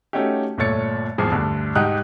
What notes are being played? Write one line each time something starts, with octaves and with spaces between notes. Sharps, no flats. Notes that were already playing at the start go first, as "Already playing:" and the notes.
A3 C#4 D#4 F#4 G4
G1 A#2 A3 C#5 A6 C#7
G#1 E2 F3 G#4
D2 G2 D3
G#2 D#4 G4 F#5 D#6 F#6